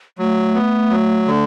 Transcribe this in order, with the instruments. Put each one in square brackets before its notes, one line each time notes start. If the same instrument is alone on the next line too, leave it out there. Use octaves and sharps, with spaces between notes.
[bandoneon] F#3 [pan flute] A3
[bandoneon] B3
F#3
D3